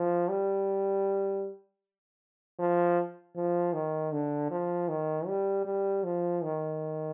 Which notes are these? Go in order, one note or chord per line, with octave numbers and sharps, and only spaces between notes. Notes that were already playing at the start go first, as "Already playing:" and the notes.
Already playing: F3
G3
F3
F3
D#3
D3
F3
D#3
G3
G3
F3
D#3